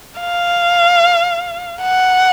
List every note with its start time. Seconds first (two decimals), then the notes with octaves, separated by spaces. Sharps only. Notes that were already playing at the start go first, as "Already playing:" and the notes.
0.21 F5
1.82 F#5